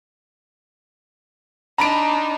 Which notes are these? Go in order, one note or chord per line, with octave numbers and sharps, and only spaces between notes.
D4 D#4 A#5 B5 D7